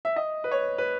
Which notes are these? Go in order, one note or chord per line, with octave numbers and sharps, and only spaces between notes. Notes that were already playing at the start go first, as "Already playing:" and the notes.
E5
D#5
B4
C#5
B4